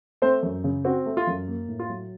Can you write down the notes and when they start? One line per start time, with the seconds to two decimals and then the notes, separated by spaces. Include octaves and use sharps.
0.22 A3 C4 C5
0.43 F#2
0.64 C#3
0.85 C4 F#4
1.06 A3
1.17 F4
1.27 F#2
1.48 A#3
1.68 A2
1.79 F4
1.90 F#3